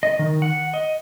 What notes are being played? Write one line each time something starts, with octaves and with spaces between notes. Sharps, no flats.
D#5
D#3
F#5
D#5